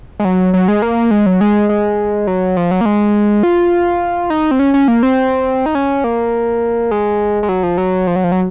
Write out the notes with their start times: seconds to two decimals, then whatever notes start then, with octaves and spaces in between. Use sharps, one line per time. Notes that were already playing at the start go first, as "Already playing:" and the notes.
0.20 G#3
0.25 F#3
0.54 F#3
0.68 G#3
0.82 A#3
1.11 G#3
1.26 F#3
1.41 G#3
1.69 G#3
2.27 F#3
2.57 F3
2.71 F#3
2.81 A#3
2.86 G#3
3.43 F4
4.30 D#4
4.51 C4
4.59 C#4
4.74 C#4
4.88 A#3
5.03 C4
5.66 D#4
5.75 C#4
6.04 A#3
6.91 G#3
7.43 G#3
7.49 F#3
7.63 F3
7.78 F#3
8.07 F3
8.16 F#3
8.24 F3
8.32 F#3